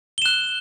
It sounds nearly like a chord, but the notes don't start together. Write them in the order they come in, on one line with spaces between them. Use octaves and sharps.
G7 E7 F#6